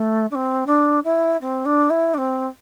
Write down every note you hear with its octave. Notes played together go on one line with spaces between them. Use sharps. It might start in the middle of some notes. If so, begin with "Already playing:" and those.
Already playing: A3
D4
C4
D4
E4
C4
D4
E4
D4
C4